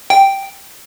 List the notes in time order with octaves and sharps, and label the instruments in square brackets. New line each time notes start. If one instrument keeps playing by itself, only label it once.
[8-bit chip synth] G5